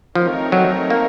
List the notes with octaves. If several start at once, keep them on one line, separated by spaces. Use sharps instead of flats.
F3 A3 C4 D#4 A#4 C#5
F#3
A#3